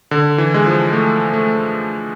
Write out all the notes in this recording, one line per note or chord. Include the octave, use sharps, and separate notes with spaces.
D3
E3
G#3
F3
A3
A3